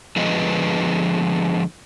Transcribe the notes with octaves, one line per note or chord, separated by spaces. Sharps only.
D3 F3 G#3 B3 B4 D#5